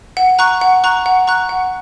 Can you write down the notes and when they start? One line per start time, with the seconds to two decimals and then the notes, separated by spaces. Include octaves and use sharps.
0.17 F#5
0.39 A#5 C#6 F#6
0.61 F#5
0.84 A#5 C#6 F#6
1.06 F#5
1.27 A#5 C#6 F#6
1.49 F#5